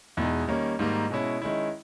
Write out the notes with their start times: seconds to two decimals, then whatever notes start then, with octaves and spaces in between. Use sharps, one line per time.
0.17 E2 B2 G#3 D#4
0.47 D#3 G3 A#3 C#4
0.79 G#2 D#3 G3 A#3
1.10 B2 G#3 C#4 E4
1.42 D#3 G#3 C#4 E4